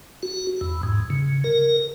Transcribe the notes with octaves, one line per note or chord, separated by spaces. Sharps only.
F#4
E2
G#2
C#3
A#4